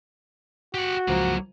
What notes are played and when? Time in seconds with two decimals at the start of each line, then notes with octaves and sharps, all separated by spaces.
0.74 F#4 G4 F#5
1.08 C#2 F3 F#3 A#3 A#5